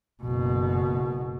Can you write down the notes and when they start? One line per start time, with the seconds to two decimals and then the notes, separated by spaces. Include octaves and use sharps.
0.22 F#1 B2